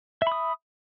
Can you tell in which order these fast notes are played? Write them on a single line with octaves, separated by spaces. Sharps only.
E5 B5 D#6